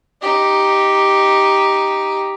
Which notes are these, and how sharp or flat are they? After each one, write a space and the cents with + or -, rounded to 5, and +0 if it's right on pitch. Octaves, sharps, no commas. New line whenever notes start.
D#4 +0 G4 +0